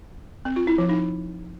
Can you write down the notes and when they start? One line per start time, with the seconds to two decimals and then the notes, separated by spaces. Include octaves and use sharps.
0.45 C4
0.56 F4
0.67 E4
0.78 F3
0.89 D#4